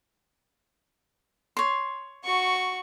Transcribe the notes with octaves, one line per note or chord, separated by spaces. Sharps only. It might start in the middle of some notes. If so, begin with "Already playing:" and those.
C#5 C6
F#4 C#6